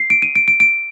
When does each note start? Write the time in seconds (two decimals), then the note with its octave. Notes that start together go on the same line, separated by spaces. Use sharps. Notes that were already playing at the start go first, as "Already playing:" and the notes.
Already playing: C7
0.10 D7
0.22 D#7
0.35 D7
0.48 D7
0.60 D7